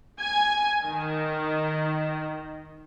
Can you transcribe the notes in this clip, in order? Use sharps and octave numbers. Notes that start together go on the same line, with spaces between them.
G#5
D#3